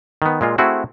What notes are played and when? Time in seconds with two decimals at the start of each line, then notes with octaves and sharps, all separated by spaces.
0.22 D#3 B3
0.41 A#2 G#3 F4
0.58 A3 C4 E4 F#4 G#4